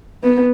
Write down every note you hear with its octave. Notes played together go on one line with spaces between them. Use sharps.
B3